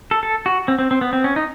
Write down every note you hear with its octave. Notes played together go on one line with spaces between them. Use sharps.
A4
A4
F#4
C4
C4
C4
B3
C4
C#4
D#4